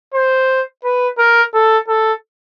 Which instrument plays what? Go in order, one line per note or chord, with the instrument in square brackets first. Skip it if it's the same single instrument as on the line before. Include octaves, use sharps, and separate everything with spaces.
[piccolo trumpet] C5
B4
A#4
A4
A4